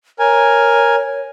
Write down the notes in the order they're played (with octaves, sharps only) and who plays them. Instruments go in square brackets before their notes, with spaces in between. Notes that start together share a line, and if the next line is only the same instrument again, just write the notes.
[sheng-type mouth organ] A#4 G#5 [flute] C#5